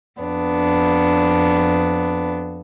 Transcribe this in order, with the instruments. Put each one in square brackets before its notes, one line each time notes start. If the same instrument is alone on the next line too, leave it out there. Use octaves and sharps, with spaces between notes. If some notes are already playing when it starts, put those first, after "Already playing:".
[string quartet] F2 B3 D4